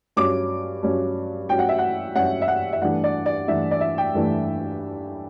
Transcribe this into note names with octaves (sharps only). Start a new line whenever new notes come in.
G2 F#3 C#4 D6
G2 F#3 C#4
G2 F#3 C#4 G5
F#5
E5
F#5
G2 F#3 C#4 F#5
E5
F#5
E5
G2 E3 A3 D4 F#5
D5
D5
G2 E3 A3 D4 E5
D5
E5
G5
G2 E3 A3 D4